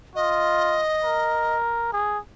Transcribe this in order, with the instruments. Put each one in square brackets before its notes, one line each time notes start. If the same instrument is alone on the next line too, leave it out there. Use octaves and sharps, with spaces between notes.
[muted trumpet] F4 [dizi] D#5
[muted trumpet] A#4
G#4